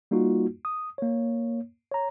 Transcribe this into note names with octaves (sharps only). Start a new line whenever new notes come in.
G3 A#3 D#4 F4 F#4
D#6
A#3 C#5
C#5 A#5